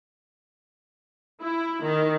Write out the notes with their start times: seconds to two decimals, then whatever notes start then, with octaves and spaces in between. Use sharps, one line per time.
1.41 E4
1.82 D#3